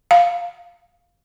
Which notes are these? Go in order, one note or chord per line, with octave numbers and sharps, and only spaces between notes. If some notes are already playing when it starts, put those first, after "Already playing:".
F5